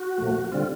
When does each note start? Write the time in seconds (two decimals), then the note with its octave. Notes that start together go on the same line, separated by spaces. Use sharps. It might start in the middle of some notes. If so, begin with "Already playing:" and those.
Already playing: F#4
0.18 A#2 F3 A3
0.52 D3 G3 C4 F4